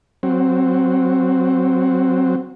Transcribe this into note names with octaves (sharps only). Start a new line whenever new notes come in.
F#3 C4